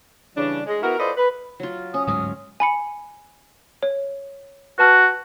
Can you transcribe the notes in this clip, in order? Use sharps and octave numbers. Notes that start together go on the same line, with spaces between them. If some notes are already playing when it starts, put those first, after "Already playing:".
C#3 E3 G3 C#4 D4
G#3
B3 E4 F#4 A#4
F4 A4 B4 C5 D5 D#5
B4
F#3 F4
C#4 D#6
D1 G#2 F#3 D#6
G#5 B5 C#7
C#5
F#4 B4 A5 F6